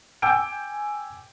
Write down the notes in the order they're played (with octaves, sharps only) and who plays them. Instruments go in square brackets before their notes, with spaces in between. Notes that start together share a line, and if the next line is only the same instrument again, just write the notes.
[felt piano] G5 G#5 D6 E6 G6 D7